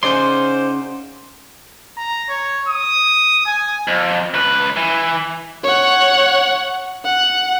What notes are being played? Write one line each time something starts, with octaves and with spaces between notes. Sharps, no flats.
C#3 C#4 D#4 F#4 C5 D5 C6
A#5
C#5
D#6
G#5
F2
C#2 B4
E3
C#5 F#5
F#5